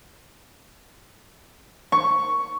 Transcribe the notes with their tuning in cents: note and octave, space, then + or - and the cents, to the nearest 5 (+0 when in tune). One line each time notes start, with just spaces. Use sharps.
C#6 +5